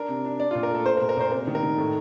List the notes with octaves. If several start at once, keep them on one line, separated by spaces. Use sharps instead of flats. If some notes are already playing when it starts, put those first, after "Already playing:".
Already playing: D4 A#4
C3
D4
D4 D5
A#2 F4
A#4
A3 A4
A3 C5
A#4
A#2
A#4
A#2 C5
C3 A#4
D#3
A#4
D#3
A2